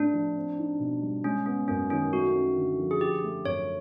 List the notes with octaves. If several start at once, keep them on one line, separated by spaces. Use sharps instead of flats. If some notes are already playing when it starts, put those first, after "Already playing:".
Already playing: A2 A3 C4 D4
F3
C4
D#4
B2
G3
G#3 C#4
B3 C#4
F#2 C#4
D#3 C#4
A3 F#4
C#4
D3
F3
G#4
F3 G4
A3
F#2 C#5